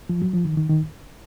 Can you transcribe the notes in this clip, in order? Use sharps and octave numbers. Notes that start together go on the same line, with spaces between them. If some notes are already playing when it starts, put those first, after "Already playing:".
F3
F#3
F3
D#3
D#3
D#3